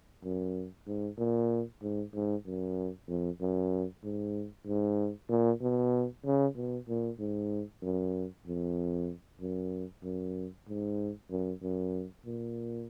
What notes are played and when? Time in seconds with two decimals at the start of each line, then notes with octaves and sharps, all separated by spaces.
0.24 F#2
0.87 G#2
1.18 A#2
1.82 G#2
2.14 G#2
2.46 F#2
3.08 F2
3.41 F#2
4.03 G#2
4.67 G#2
5.29 A#2
5.61 B2
6.25 C#3
6.56 B2
6.88 A#2
7.19 G#2
7.82 F#2
8.46 F2
9.41 F#2
10.04 F#2
10.68 G#2
11.30 F#2
11.62 F#2
12.25 A#2